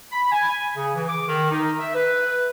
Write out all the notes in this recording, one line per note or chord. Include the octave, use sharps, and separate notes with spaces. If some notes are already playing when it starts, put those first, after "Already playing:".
B5
G#5
C#3
E3
D6
D#3
D#4
E5
B4